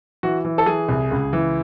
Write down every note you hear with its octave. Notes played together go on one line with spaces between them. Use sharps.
E3 F#4
E3
A4
E3 G#4
C2
C#2
E3